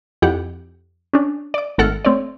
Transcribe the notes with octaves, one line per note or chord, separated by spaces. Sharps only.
F2 E4 G4 F#5
C#4 D4
D5 D6
G#1 A3 A4 F#5 F6 C#7
A3 C4 C#5 D5